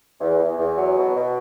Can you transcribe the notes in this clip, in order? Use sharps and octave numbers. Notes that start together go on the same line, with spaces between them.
E2
E2
E2
F#3
B2
B2